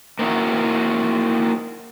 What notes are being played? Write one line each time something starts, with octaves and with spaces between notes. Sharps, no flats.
A#3 C4 D#4 E4 F#4